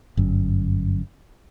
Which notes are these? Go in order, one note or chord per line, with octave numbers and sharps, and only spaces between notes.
G1 F#2